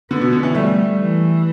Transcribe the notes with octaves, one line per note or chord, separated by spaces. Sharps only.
D3 B3
B2
D3
E3
G3 A3
E3